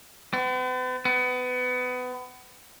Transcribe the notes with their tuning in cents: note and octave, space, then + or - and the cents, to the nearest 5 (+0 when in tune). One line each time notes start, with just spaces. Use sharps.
B3 +45
B3 +25